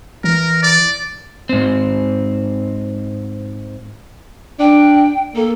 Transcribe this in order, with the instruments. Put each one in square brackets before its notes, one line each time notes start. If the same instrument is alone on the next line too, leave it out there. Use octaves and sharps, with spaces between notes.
[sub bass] E3 [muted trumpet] A#4
[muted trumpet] D5
[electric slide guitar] G#2 C4
[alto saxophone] D4 [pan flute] G5
[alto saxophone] A#3 [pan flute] A4